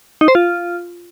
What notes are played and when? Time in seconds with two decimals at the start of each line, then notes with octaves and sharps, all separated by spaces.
0.21 D#4
0.28 C5
0.35 F4